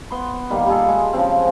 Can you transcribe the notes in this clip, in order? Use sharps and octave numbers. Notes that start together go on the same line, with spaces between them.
B3 C6
D#3 G3 A#3
G3 F4 G#4 A4
G#3
C#3 F3 C4